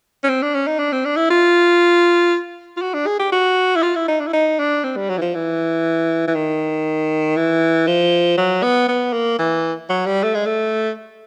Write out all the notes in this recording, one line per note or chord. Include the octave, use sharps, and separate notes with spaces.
C#4
C4
D4
C#4
D#4
D4
C4
D4
E4
F4
F4
F#4
D4
G#4
G4
F#4
E4
F4
E4
D#4
D4
E4
D#4
D4
C4
G3
F#3
E3
F3
E3
E3
D#3
E3
F3
F#3
B3
B3
A#3
E3
F#3
G3
A3
G#3
A3